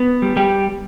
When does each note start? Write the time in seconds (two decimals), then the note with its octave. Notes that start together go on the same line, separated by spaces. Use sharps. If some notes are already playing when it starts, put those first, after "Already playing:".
Already playing: B3
0.22 G3
0.36 G3 G4